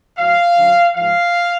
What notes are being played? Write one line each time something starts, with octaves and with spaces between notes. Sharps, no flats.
A2 F#3 F5
F#2 D3 F#3
G#2 F3 F5